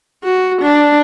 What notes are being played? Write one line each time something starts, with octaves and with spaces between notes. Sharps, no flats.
F#4
D4